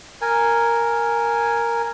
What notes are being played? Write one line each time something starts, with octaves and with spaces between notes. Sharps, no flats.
A#4 G#5